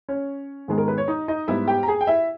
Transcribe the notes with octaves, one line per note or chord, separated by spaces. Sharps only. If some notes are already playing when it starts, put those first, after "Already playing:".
C#4 C#5
G#2 D#3 G#3 B3
A#4
B4
C#5
D#4 D#5
D#4 D#5
G#2 G3 B3 E4 E5
G4 G5
A#5
G#4 G#5
G5
E4 E5